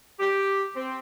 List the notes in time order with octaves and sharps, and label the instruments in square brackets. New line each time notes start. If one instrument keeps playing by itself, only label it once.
[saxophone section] G4
C4